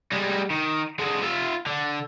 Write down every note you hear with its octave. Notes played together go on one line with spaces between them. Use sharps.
G3 G#3
D#3
D3 G#3
F4 E5
D3